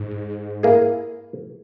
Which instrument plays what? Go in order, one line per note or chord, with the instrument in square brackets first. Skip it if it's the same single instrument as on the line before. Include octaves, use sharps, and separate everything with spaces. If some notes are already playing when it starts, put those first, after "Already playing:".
Already playing: [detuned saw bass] G#2
[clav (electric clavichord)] A#3 E4 G#4